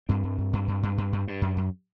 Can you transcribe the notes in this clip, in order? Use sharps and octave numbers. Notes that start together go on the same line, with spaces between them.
G2 C4
G2
G2
G2
G2
G2
G2
G2
G2
F#2
F#2